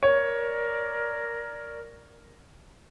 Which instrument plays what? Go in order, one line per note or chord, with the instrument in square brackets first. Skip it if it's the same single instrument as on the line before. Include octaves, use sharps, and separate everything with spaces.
[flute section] A#4 D5 [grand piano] C#5